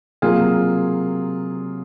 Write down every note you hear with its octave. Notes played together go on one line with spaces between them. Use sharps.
C3 F#3 A#3 F4 G#4